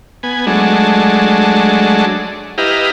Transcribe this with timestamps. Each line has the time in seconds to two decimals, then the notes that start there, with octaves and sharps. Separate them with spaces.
0.23 B3 G#5
0.47 F#3 G#3 A3 D4
2.58 E4 G4 B4 D#5 F5 A#5